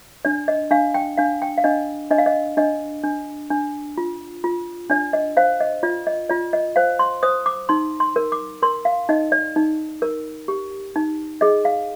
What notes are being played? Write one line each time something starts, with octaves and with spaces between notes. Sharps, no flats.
D4 D5
D#5
D4 F5
G5
D4 F5
G5
F5
D4 D#5
D4 D#5
F5
D#5
D4 D#5
D4
D4
F4
F4
D4 D5
D#5
C5 F5
D#5
F4 D5
D#5
F4 D5
D#5
C5 F5
C6
C5 D#6
D6
D#4 C6
C6
A#4
D6
A#4 C6
F5
D#4 D#5
D5
D#4
A#4
G4
D#4
G#4 D#5
F5